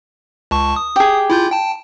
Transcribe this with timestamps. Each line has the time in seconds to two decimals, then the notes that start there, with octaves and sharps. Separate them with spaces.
0.51 C#2 A5 C#6
0.76 D#6
0.96 G4 G#4
1.30 E4 F4 G6
1.51 G5 A5